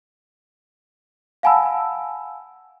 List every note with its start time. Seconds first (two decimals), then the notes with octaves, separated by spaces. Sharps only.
1.43 F5 F#5 G#5 A5 B5 E6